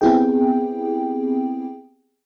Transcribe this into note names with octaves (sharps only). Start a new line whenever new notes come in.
B3 C4 E4 G4 G#4 G5